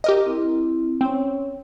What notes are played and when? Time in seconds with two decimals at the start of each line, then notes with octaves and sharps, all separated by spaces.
0.04 G4 A#4 D#5
0.26 C4 E4
1.01 C4 C#4 C#5